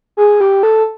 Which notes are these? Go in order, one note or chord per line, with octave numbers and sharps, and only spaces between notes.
G#4
G4
A4